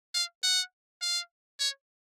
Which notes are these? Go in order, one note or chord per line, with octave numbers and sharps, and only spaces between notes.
F5
F#5
F5
C#5